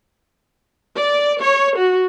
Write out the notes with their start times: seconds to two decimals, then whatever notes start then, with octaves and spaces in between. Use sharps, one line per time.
0.97 D5
1.41 C#5
1.77 F#4